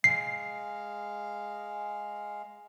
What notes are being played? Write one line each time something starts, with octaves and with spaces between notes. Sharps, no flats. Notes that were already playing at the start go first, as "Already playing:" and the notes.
G#3 F5 C7